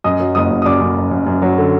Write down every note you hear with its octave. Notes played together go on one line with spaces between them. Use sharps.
F#2 D#5 D#6
F#3
F#1 D#5 D#6
F#2
D#6
F#2 D5 D6
F#2
F#2
F#2
F#2
F#3
D3